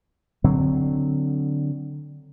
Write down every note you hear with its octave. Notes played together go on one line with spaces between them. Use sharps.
D3 F#3 C4